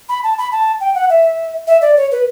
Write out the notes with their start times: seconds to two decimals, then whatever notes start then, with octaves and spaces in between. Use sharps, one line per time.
0.09 B5
0.24 A5
0.38 B5
0.52 A5
0.81 G5
0.95 F#5
1.10 E5
1.67 E5
1.82 D5
1.97 C#5
2.12 B4